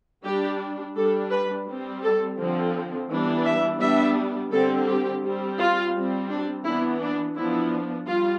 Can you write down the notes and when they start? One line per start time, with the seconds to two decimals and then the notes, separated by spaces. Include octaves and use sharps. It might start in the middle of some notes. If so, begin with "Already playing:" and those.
0.24 G3 D4 G4
0.96 G3 D4 A4
1.31 B4
1.67 G3 C4
2.03 A4
2.38 D3 F3 C4
3.09 E3 G3 B3 D4
3.45 E5
3.80 G3 B3 D4 E5
4.51 D3 G3 C4 A4
4.86 G4
5.23 G3 C4
5.58 F4
5.93 G3 C4
6.29 D4
6.64 E3 B3 D4 E4
7.00 D4
7.35 F3 B3 D4 E4
8.07 G3 F4